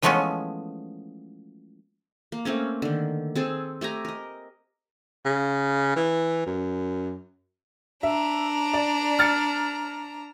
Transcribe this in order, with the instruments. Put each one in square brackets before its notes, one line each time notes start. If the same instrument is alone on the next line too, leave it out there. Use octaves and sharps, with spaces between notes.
[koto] E3 F3 G#3 A3 B3 C#4
[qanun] A#3
A3 A#3 C4 C#4
D3 D#3
C4 G#4 A4
A3 G4 G#5 A#5
A#4 D#5
[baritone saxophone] C#3
E3
F#2
[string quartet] D4 A#5 [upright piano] E5
[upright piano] D5
F6 A6 C#7